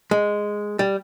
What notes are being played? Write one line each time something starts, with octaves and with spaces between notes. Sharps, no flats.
G#3
G3